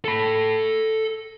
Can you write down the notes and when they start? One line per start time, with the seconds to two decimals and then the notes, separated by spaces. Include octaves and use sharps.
0.04 A4 B5